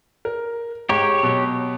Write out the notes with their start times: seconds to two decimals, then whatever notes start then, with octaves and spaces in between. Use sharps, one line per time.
0.25 A#4
0.89 G#2 G4 C#5 G5 A#5
1.23 B2 F#3